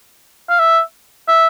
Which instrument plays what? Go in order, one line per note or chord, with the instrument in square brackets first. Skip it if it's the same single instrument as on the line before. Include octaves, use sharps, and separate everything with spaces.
[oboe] F5
E5
E5